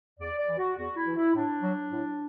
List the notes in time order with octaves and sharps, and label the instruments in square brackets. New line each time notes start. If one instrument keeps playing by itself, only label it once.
[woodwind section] E2 D5
D5
E3
F#4
E2 F#4
E4
E3
E4
A2 D4
F#3
A2